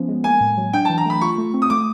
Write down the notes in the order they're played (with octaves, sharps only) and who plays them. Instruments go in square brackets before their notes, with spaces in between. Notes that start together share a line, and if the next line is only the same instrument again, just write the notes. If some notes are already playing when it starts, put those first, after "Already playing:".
Already playing: [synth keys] F3 B3 C#4
G#3
[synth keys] A#3 [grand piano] G#5
[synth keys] A2
F#3
[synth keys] D4 [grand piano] G5
[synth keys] E3 [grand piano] A5
[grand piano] A#5
[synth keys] A3 [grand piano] B5
[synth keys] F4 [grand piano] C#6
[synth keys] A3
C4
[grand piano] D#6
[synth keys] A3 [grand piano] D6